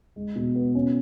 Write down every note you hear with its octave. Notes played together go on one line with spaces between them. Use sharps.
G#3
B2
B3
C#4